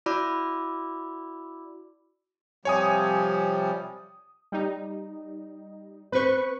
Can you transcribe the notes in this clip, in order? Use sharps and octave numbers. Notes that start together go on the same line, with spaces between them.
E4 F#4 D5 B5 D6 E6
C3 F3 G3 C#5 G#5 D#6
G3 D#4
C4 B4 C5 C#6